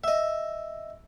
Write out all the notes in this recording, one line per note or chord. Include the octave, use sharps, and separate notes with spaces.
D#5 E5